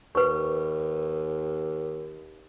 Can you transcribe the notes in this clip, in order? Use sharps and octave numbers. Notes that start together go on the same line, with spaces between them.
D#2 B4 C#6